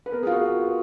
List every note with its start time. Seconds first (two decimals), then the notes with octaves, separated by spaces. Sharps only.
0.06 B4
0.12 B3 A#4
0.23 G#4
0.27 F4
0.32 F#4